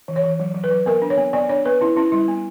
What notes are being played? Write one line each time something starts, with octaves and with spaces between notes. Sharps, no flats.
E3
C#5
E3
F#3
F#3
B4
F#3
B3 A#4
D4
C#5
B3
B3 D5
D4 C#5
B3 B4
C#4 E4
C#4 E4
G3 E4
B3